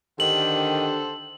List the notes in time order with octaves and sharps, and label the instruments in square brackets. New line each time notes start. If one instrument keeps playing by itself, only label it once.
[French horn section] D3 G4 [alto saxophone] D#3 [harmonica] A4 C5 F#5 [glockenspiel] F#7